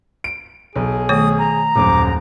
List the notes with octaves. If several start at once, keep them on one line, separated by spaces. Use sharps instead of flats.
D7
B1 G#4
D#3 A3 C#5 D#6
A#5
D#1 F#2 C5 D6